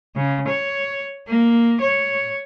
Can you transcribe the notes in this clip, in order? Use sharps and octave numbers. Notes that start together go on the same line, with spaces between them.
C#3
C#5
A#3
C#5